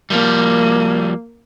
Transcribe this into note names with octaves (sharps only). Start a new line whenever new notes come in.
F3 G3 A#3